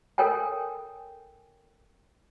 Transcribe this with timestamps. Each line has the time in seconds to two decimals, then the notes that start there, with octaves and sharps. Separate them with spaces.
0.18 A4 A#4 C#5 G5 G#5